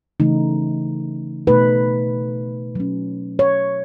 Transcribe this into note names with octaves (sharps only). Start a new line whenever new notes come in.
C#3 E3 A3 D#4
B2 A3 D#4 B4
F#3 C#4
C#5